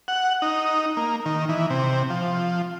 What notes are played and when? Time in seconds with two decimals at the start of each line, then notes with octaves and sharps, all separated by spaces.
0.08 F#5
0.42 D#4
0.97 A#3
1.26 D#3
1.49 E3
1.70 C3
2.10 F3